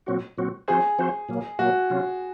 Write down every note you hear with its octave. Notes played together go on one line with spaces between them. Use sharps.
A#2 F#3 C4 F#4
A#2 F#3 C4 F#4
F3 C4 F#4 G#4 C5
F3 C4 F#4 C5
A#2 F#3 A#3
A#2 F#3 A#3 F#4
C3 F#3 C#4 F4